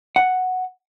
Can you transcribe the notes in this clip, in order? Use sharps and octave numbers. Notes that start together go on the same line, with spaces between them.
F#5